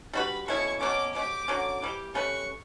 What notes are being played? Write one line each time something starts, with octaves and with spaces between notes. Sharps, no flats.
G3 D4 F#4 B4 B5
B2 A3 C#4 E4 C#6
B2 F#3 C#4 D6
F#3 C#4 G4 D6
D3 F#3 C#4
E3 G3 D4 G4
A3 C#4 G4 B4 C#6